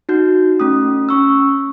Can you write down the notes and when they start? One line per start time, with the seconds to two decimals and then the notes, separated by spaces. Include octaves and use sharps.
0.09 D#4 F#4 G6
0.60 A3 C#4 D#6
1.09 C#4 C#6 E6